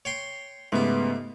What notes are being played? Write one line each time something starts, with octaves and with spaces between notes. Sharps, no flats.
C#5 G5 C6
G#2 C#3 A3 B3 G4